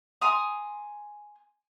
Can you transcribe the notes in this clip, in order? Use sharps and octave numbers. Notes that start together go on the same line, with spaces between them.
G#5 A#5 C6 D#6